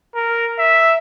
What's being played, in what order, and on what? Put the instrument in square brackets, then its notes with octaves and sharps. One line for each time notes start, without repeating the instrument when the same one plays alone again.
[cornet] A#4
E5